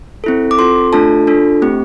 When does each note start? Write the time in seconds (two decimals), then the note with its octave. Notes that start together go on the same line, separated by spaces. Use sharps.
0.24 C4 E4 A4
0.51 D6
0.58 C4 F4 A4 C6
0.93 A3 D4 F4 A4 A5
1.27 D4 F4 A4
1.62 A3 C4 G4